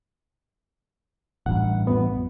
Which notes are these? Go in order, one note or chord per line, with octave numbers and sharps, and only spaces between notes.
A1 G2 F#5
F2 B3